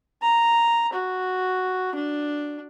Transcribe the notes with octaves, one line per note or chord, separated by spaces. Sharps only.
A#5
F#4
D4